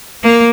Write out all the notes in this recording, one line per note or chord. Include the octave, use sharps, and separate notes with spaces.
A#3